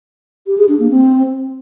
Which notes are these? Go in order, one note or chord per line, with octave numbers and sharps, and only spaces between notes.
G4
G#4
D4
A#3
C4